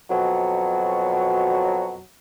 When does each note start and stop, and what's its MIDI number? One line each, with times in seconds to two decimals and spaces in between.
0.10 1.98 41
0.10 1.98 47
0.10 1.98 54